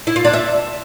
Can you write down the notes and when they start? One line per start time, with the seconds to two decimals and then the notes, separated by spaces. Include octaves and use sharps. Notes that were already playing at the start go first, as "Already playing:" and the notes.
0.07 E4
0.16 F4
0.25 D4
0.33 E5